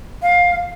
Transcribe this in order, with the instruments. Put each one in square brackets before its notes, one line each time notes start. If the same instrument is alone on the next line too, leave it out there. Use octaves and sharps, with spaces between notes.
[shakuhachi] F5